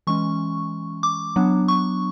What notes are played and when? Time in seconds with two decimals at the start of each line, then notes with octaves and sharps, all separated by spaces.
0.07 E3 G#3 C#4 C#6
1.03 D6
1.36 F#3 B3 D4
1.68 C#6